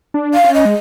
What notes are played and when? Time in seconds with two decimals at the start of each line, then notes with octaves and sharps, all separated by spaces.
0.14 D4
0.34 F5
0.44 C#4
0.54 D#5
0.65 G#3